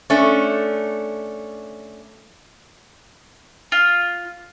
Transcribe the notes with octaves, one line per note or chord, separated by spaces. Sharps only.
A3 C#4 D4
F4